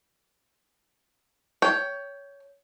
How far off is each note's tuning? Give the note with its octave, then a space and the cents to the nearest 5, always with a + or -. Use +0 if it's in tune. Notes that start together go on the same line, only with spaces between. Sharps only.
C#5 +20 G5 +0